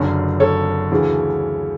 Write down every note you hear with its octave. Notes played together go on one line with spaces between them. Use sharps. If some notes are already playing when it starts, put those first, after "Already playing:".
Already playing: F#1 F#2 D3
A4 C#5
D2 C#3 E3